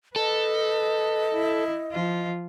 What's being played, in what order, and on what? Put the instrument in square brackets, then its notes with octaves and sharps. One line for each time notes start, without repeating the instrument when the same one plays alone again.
[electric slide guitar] A4 [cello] B4 [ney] D#5
[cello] E4
F3 F4